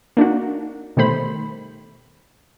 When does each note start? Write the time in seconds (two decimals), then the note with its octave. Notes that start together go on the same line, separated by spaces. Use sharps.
0.17 A#3 D4 D#4 F#4
0.97 B2 D#3 G3 A3 C5 B5